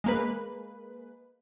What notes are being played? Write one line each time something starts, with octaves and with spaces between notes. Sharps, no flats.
G#3 A#3 B4